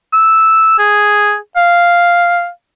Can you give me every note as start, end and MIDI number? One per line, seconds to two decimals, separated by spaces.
0.13 0.76 88
0.79 1.36 68
1.57 2.49 77